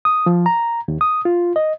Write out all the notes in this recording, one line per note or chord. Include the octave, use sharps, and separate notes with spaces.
D#6
F3
A#5
D#2
D#6
F4
D#5